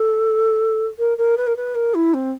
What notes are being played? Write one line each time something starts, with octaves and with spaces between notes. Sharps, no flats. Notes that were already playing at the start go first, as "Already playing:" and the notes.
Already playing: A4
A#4
A#4
B4
A#4
B4
A#4
E4
C4